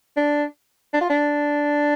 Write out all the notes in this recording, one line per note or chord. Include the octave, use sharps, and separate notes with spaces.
D4
D4
F4
D4